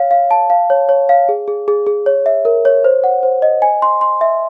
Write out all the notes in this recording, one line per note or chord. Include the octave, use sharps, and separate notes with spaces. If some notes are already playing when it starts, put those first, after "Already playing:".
Already playing: C#5 F5
F5
A5
F5
C#5
C#5
F5
G#4
G#4
G#4
G#4
C#5
E5
A#4
C#5
C5
F#5
C5
D#5
G#5
C6
C6
E5